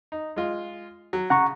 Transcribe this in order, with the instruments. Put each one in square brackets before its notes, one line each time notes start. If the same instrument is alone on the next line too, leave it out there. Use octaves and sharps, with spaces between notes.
[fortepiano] D#4
G#3 F4
F#3
[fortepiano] C#3 [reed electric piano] F#5 A#5 C#6